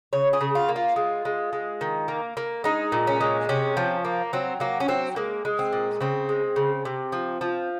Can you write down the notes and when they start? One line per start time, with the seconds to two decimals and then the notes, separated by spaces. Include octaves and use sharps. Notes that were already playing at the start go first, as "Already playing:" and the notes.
0.13 C#3 C#5
0.33 G#4
0.41 C#3
0.55 F4
0.69 A#3
0.76 F4
0.96 G#3
1.25 G#3
1.53 G#3
1.81 D#3
2.08 A#3
2.37 A#3
2.64 G#3 D#4
2.92 A#2
3.07 C#4
3.21 G#3
3.49 C3 C#4
3.77 F3
4.05 A#3
4.33 F#3 C4
4.60 F#3 A#3
4.80 C#4
4.88 F#3 C4
5.16 G#3 A#3
5.45 G#3
5.59 C4
5.73 A#2
6.01 C#3 C4
6.29 G#3
6.56 C#3
6.85 C3
7.12 F3
7.41 F3